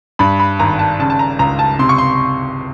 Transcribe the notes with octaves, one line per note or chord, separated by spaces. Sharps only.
G2 B5
B5
G#1 A#5
A5
C#3 A5
A5
A#5
C#2 A#5
A5
C3 C6
C#6
C6